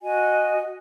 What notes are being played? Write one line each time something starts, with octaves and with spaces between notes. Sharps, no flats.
F#4 D#5 G#5